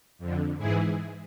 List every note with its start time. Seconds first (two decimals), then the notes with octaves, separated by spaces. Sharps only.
0.19 F2 D3
0.58 G#2 E3 E4 G#4